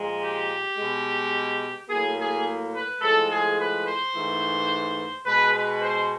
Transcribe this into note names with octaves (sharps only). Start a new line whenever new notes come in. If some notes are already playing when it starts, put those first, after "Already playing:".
Already playing: A#2 F3 G#3
G4
B2 G#3
A2 F#3 A#3 G#4
G#4
B4
A2 F3 G#3 A4
G#4
B4
C5
G#2 E3 A3
B2 G#3 B4
B4
C5